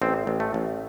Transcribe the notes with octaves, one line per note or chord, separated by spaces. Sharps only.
A1 C4
A1
A3
A1